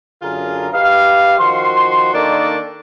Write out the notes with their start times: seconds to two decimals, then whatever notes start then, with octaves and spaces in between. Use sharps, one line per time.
0.22 F#2 D3 F4 G#4 A#4
0.73 G4 B4 D#5 F5
1.38 D#3 F3 F#4 C6
2.13 D#3 A#3 D4 D#4 A4 D5